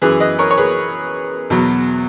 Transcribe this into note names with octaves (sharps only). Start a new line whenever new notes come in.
F#2 E3 G#4 B4
B4 D#5
A#4 C#5
C#5
G#4 B4
E2 B2 F#3